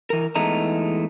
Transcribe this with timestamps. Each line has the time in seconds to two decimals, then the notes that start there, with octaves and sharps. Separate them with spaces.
0.10 E3 A#4
0.35 E2 E3 G#3 A3 D#4 A#5